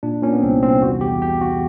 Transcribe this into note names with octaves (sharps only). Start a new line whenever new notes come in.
A#2 D4
A#2 C#4
B3
C2 C4
C2 C4
E2 F#4
E2 G4
C3 G4
E2 F#4